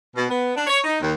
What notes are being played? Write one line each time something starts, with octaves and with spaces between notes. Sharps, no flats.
B2
B3
D4
C#5
D#4
D#2